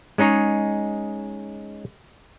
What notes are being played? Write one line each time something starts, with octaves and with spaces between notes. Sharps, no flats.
G#3 C#4 D#4 G#4 C#5